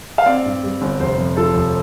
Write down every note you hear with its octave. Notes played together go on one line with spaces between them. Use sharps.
F5
C4 D5
G2
G3
G1
F1 C5
F2
F3 A4
F1